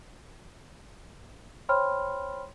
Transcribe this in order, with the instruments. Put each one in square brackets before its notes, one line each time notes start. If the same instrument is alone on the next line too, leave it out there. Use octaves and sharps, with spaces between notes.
[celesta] C5 C#5 G5 B5 C6 F6